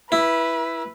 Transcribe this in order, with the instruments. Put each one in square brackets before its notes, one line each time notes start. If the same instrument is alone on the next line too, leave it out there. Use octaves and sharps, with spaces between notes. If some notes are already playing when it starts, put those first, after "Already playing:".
[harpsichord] E4 [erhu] B4